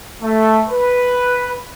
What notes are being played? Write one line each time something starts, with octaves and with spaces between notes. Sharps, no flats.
A3
B4